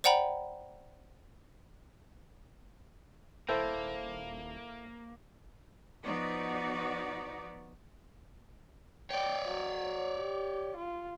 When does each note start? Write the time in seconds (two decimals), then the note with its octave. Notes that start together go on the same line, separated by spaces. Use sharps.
0.04 C5 D5 F#5 G5 A#5 B5
3.48 D#1 A#3 E4 A4 C5 G5
6.03 F3 B3 D#4 F#4 D5
9.10 C#5 D5 G5
9.47 F#3
10.19 G4
10.76 F4